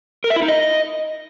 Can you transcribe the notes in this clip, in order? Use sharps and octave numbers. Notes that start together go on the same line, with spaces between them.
A#4
E5
E4
D#4
D#5